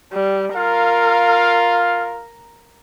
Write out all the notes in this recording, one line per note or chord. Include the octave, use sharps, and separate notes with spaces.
G3
F4 A#4 F5